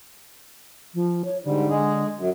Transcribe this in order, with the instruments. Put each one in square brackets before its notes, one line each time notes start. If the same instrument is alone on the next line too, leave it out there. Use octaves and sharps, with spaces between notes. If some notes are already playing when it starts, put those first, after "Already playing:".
[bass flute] F3
C#5
[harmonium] G#2 G3 [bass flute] D3
[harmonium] G#3 G#4
F#2